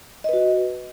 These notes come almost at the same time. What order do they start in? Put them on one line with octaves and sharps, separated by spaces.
D#5 B4 F#4